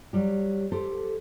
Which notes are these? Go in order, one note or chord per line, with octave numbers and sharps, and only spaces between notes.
F#3 G3 G4
G4 A4 C5